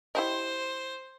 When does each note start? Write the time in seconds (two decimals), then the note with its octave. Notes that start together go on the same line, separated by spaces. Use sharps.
0.15 E4 G4 C5 D#5